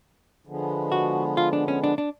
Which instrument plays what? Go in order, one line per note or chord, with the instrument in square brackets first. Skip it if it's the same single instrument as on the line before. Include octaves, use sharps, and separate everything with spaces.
[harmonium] D3 F3 G#3 B3
[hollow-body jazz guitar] F#4
F4
D4
C#4
D4
D4